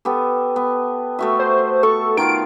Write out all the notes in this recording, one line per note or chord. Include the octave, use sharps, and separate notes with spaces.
B3 G4 A4
B3
A3 F#4 E5
C5
A4 C#6
D#3 F4 F5 D7